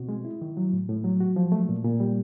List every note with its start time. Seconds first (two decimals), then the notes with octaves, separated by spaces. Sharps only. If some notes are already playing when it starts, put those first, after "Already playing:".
Already playing: B2 C4 F#4
0.09 G#3
0.25 E4
0.41 D#3
0.57 F#3
0.73 A2
0.89 A2
1.04 F#3
1.20 F#4
1.36 F3
1.52 A3
1.69 A#2
1.84 A#2
2.00 G3